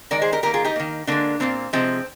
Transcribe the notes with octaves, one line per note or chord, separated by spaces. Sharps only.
D#3 G#3 A#4 D5
G#4 C5
G4 A#4
D#3 A#3 G4 A#4
F4 G#4
D#4 G4
D#3 A#3
D3 G#3 A#3 D4
A#2 F3 A#3 C4
C3 F3 G#3 C4